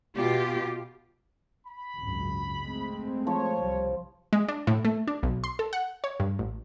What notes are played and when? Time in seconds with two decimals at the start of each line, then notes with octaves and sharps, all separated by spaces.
0.16 B2 F4 G4
1.66 B5
1.97 G#1 C#2 F#2
2.63 G#3 A3 C4
3.27 F3 C#5
3.62 C2 G3
4.33 G#3
4.48 D4
4.67 A2
4.85 A3
5.08 D4
5.23 B1
5.44 C6
5.59 A4
5.73 F#5
6.04 C#5
6.20 G2
6.39 A1